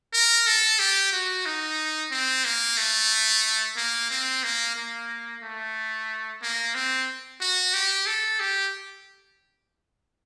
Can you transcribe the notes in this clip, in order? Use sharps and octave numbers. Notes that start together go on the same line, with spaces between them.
A#4
A4
G4
F#4
D#4
C4
A#3
A3
A#3
C4
A#3
A#3
A3
A#3
C4
F#4
G4
A4
G4